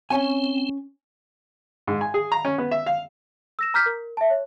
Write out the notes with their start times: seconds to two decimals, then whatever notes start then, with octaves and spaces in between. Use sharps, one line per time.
0.10 C4 C#4 C#5 G#5
1.88 G#2
2.01 G#5
2.14 G#4
2.32 A#5
2.45 C#4
2.58 B3
2.71 E5
2.86 F5
3.59 E6 A#6 E7
3.74 A#5 D6 F6 G6 B6
3.86 A#4
4.17 E5 A5
4.30 C#5